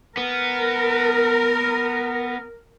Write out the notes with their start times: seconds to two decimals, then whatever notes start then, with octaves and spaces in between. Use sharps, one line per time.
0.17 B3 A#4